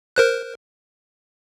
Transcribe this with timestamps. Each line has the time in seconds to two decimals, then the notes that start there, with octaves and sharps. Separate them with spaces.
0.16 A#4 C5 F#6